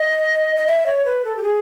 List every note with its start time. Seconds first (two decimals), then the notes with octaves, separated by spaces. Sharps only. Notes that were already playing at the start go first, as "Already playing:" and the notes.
Already playing: D#5
0.56 D#5
0.67 E5
0.86 C#5
1.05 B4
1.25 A4
1.37 G4
1.43 G#4